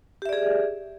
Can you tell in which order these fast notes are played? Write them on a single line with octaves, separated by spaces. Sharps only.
G4 E5 D5 G#4